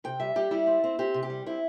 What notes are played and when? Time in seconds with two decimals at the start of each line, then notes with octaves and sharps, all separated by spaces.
0.04 C3 G5
0.20 G3 E5
0.36 G3 G4
0.51 G3 E4
0.67 C4
0.84 C4
0.99 C4 G4
1.14 C3
1.23 G4
1.30 G3
1.46 C4 E4